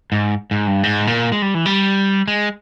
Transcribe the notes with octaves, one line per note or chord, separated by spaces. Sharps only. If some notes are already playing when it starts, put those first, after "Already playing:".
G#2
G#2
G2
G#2
A#2
G#3
G3
E3
G3
G#3